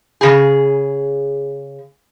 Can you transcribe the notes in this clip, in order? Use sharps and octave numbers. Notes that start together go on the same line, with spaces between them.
C#3 G#4